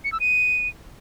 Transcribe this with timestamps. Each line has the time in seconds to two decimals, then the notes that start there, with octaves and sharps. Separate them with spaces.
0.04 C#7
0.12 E6
0.20 D#7